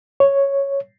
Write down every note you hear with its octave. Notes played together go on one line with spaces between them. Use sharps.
C#5